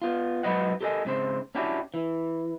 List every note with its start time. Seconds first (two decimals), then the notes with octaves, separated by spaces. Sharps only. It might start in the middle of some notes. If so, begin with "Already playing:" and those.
0.02 B3 F4
0.43 G#2 F3 F#3 B4 D#5 F#5
0.81 G4 A4 A#4 C#5 D#5 G#5
1.05 G#2 C#3 C4 C5
1.55 C#4 D4 E4 F#4 G4
1.94 E3